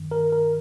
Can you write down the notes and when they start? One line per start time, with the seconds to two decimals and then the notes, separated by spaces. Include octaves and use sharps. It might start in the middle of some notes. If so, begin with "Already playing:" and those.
Already playing: G2 D#3
0.11 A#4
0.32 A#4